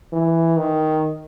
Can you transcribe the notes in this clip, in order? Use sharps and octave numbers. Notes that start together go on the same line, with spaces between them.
E3
D#3